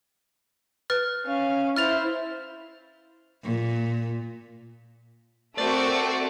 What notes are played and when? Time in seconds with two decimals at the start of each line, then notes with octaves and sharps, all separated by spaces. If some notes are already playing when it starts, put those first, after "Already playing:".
0.90 B4 F6 A6
1.26 C#4 F5
1.76 E4 C5 F6 A6 F7
3.44 A#2
5.58 A3 C4 F#4 A#4 C5 D5 E5